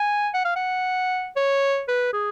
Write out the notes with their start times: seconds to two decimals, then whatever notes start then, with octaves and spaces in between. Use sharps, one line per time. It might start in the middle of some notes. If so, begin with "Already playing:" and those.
Already playing: G#5
0.34 F#5
0.45 F5
0.56 F#5
1.36 C#5
1.88 B4
2.13 G#4